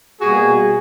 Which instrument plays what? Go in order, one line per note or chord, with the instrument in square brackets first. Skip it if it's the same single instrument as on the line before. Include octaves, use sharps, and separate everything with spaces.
[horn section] B2 G3 A#3 F#4 G#4